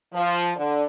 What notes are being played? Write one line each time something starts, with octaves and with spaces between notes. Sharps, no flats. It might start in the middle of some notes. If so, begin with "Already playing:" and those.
F3
D3